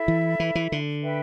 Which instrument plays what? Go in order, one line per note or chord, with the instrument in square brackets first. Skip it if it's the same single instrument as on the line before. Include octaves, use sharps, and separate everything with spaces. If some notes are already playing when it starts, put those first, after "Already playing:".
Already playing: [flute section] E4 A4 E5 B5
[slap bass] E3
E3
E3
D3
[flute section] B4 E5 G5 B5